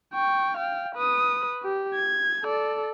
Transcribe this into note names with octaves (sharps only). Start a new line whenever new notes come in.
G5 C#6
F5 G5
B4 D#6
G4
G#6
A4 D5